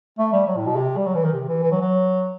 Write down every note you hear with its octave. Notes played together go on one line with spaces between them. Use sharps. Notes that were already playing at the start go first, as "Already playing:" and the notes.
A3
G3
F#3
A2
B2
C3
G3
F#3
E3
D#3
C3
E3
E3
F#3
F#3